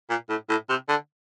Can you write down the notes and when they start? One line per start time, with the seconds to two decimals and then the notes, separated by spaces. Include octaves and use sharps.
0.10 A#2
0.29 A2
0.49 A2
0.69 C3
0.89 D3